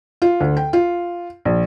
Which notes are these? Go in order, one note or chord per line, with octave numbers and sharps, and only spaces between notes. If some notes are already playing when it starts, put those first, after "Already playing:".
F4
D2
G5
F4
A#1